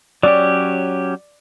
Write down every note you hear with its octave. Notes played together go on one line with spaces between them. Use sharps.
F#3 C#4 G4 D5